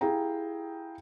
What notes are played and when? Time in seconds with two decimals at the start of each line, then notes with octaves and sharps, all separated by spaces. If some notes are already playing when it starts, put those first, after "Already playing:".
0.01 E4 G4 G#4 F5 G5 A#5